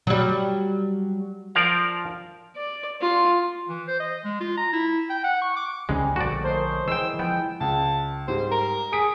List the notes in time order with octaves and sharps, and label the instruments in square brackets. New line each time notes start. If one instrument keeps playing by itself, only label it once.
[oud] F#3 G3
[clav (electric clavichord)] F3 A#4 D5 F5
[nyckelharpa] D5
F4
[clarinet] E3
C5
D#5
G#3
F4
A#5
E4
G5
F#5
C#6
D6
[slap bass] C#2 C3 C#4 [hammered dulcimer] G3 C5 G#5 [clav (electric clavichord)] G#3
[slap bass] A#1 D3 [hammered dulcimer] A3 D6 [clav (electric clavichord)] F#4 D5
[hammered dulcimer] A#4 C#5 D#5 [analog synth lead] C5
[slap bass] E3 [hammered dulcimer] G#3 E4 [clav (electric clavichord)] C5 G5 [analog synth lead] E6
[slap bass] F3 [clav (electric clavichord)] B3 [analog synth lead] G5
[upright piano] C#2 [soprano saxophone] A5
[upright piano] G#2 G3 [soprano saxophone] C5
[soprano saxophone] A#4
[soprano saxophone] G#4 [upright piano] D#6 B6 D7